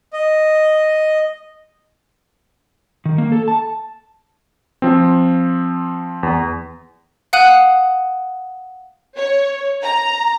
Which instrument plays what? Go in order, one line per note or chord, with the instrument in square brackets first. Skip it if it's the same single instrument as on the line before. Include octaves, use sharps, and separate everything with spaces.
[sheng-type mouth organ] D#5
[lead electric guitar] D#3
A#3
A4
A5
[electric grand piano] F3 C4
E2
[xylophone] F5 F#5 D#6 F#6 D#7 F#7
[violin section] C#5
A#5